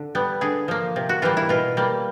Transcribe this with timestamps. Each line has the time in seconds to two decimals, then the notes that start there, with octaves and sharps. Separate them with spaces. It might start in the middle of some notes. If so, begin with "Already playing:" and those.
Already playing: D3
0.15 G3 B3
0.41 D3 G#4
0.68 F3 A#3
0.96 C3
1.09 F#4
1.22 E3 G3 A#3 F4
1.37 E4
1.49 B2 F4
1.77 G3 A#3